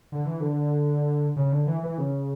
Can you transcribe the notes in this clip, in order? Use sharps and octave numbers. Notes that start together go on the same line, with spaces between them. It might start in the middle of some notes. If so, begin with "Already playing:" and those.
D3
E3
D3
C#3
D3
E3
E3
C#3